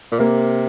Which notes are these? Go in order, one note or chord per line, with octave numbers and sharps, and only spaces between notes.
A#2
C3 A#3